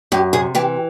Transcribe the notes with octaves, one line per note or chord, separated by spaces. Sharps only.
F#2 G4
C3 G#4
E3 G4